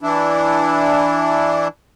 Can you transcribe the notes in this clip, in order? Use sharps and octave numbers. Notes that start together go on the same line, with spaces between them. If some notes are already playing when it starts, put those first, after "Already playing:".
E3 D4 E4